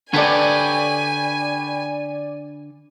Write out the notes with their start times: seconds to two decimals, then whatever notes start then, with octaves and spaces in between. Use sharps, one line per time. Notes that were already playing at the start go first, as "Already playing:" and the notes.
0.13 D3 G4 A4 B4 C#5 D5 G#5 D#7